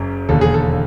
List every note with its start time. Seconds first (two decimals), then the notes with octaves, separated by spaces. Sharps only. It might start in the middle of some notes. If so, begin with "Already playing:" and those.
Already playing: F#1 F#2 C#3
0.29 E1 D#2 D3 A4
0.41 G#4
0.54 A4